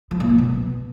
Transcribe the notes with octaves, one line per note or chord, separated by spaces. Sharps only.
F3
A#2
F#3
B2